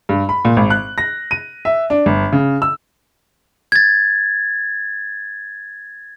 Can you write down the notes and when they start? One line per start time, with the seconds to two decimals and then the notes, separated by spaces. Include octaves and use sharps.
0.09 G2
0.29 B5
0.45 A#2
0.57 G#1
0.70 F#6
0.98 A#6
1.31 D#7
1.65 E5
1.90 D4
2.06 G1
2.32 C#3
2.62 E6
3.72 G#6 A6